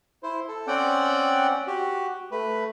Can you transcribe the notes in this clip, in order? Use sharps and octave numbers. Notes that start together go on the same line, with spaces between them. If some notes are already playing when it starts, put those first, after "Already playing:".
E4 C5
A4
C4 C#4 D5 F#5 G5
F#4 G4
A3 B4